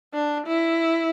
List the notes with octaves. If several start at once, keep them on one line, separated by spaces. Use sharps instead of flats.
D4
E4